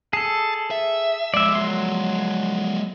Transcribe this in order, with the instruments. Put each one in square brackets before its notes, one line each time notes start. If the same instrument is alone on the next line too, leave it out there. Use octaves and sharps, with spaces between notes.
[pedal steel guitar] G#4 A4 [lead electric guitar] A5
[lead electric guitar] E5
[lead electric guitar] F3 G#3 [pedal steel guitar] D5 E5
[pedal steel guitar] F#3 C6